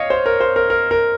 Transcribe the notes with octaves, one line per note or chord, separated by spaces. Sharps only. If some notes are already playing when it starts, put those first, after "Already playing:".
Already playing: C#5 D#5 F5
C5
A#4
C5
A#4
A#4
A#4